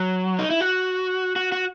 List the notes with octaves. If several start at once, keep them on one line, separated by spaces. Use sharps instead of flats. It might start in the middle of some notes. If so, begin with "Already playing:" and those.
Already playing: F#3
D#4
E4
F#4
F#4
F#4